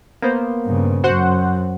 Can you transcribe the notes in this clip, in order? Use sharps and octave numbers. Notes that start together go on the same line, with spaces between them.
A#3 B3 C5
G2 C#3
F#2 F#4 C5 F#5